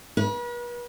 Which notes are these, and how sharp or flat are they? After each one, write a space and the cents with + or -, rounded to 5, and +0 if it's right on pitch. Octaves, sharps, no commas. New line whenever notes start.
B4 -40